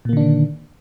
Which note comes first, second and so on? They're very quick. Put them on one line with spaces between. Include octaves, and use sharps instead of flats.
A#2 A#3 D3 D4 D#3